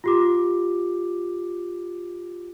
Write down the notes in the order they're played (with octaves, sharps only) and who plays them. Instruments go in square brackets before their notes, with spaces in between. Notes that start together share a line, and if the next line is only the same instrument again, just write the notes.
[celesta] F4 G4 D6